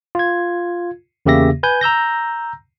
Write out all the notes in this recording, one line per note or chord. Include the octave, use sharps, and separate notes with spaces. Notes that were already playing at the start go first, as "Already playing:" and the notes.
F4 G#6
E2 C#3 A#3 G4 E5 A#6
B4 G#5 G6
A#5 E6 G6 A#6